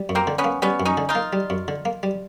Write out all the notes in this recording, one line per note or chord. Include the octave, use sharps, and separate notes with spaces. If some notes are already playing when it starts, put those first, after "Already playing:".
Already playing: G3
F#2
A#3 C4
D3
B3 C#4
A#3
G3 B3 C#4
F#2
C#4 D#4
D3
D#4 F4
A#3
G3
F#2
D3
A#3
G3